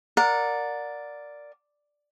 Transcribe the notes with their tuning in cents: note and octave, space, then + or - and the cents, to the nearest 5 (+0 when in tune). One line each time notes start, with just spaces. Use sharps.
A#4 -5 D5 +0 F#5 -25